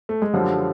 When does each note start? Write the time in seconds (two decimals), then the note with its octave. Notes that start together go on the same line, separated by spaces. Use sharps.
0.09 A3
0.22 G#3
0.34 F#2 D3 F3 G3